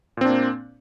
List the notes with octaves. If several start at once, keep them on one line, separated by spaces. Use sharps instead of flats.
A#2 A#3 C4 D4